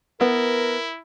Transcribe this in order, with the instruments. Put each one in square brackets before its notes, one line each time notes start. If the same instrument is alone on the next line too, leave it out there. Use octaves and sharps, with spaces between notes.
[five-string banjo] B3 [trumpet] E4 [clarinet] A#4